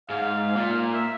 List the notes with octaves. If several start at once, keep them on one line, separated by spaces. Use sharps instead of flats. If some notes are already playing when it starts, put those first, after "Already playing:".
G#2 F5
A#2
A#4
E5